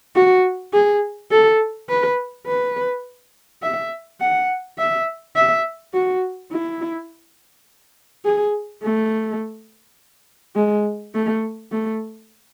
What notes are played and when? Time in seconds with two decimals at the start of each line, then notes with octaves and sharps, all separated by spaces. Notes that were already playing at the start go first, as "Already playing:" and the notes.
0.15 F#4
0.73 G#4
1.31 A4
1.89 B4
2.47 B4
3.62 E5
4.20 F#5
4.78 E5
5.36 E5
5.94 F#4
6.52 E4
8.25 G#4
8.83 A3
10.56 G#3
11.15 A3
11.72 A3